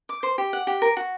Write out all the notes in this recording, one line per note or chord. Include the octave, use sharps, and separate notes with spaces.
D6
C5
G4
F#5
G4
A#4
F#4